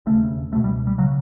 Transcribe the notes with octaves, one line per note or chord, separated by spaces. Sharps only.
E1 D#2 C#3 A3
C#2 B2 A3
G3
G3
C#3 F#3